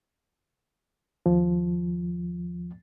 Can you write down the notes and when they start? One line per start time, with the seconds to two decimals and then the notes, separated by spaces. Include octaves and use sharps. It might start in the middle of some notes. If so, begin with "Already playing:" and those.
1.26 D#2 F3